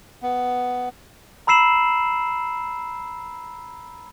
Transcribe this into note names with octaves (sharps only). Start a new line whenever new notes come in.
B3
A#5 B5 E6 C7 E7 F#7